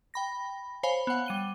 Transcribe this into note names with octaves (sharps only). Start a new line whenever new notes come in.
G5 B5 A#6
C5 C#5 F5 G#5 B5
B3 F#5
G3 D#7 G7